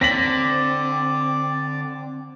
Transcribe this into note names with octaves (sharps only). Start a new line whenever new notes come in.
D3 C4 D5 A#6 B6 F#7